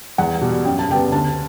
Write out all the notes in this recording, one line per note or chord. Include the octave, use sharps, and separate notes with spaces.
E2 F#5
B2 G3
F#2 G5
A5
C#3 G3 B3 G5
D2 A5